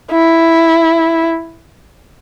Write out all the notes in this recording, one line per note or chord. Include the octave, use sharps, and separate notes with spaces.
E4